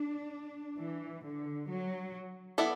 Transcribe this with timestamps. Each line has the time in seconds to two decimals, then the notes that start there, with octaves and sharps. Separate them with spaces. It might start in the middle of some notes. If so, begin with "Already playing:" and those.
Already playing: D4
0.79 E3
1.24 D3
1.69 F#3
2.58 B3 E4 A4 D5